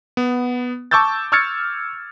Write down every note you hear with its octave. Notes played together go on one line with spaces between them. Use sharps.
B3
A5 C#6 D6 E6 G6 A6
C#6 E6 F6 G#6 A6 C#7